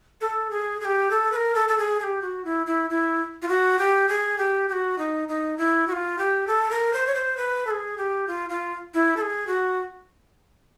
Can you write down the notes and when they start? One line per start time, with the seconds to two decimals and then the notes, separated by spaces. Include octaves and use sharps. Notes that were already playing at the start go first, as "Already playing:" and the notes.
0.21 A4
0.50 G#4
0.81 G#4
0.85 G4
1.11 A4
1.32 B4
1.36 A#4
1.55 A4
1.68 A4
1.78 G#4
2.00 G#4
2.03 G4
2.22 F#4
2.45 E4
2.66 E4
2.90 E4
3.42 F4
3.49 F#4
3.79 G4
4.09 G#4
4.38 G4
4.69 G4
4.72 F#4
4.98 D#4
5.28 D#4
5.58 E4
5.87 F#4
5.92 F4
6.18 G4
6.47 A4
6.71 A#4
6.93 C5
7.07 C#5
7.14 C5
7.37 B4
7.67 A4
7.71 G#4
7.98 G4
8.27 F4
8.50 F4
8.94 E4
9.17 A4
9.21 G#4
9.47 F#4